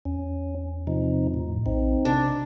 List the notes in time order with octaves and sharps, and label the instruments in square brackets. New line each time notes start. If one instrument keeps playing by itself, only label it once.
[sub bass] E2 [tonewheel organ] C#4
[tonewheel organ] C3 F3 D#4
A2
[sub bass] A#1 [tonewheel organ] C4 D#4
[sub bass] C3 [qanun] D4